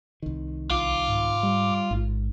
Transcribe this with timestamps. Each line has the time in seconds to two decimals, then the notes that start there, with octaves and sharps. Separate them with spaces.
0.22 C2 D#3
0.70 B1 F4 D6
1.08 G#2
1.43 G3
1.91 A1 G#2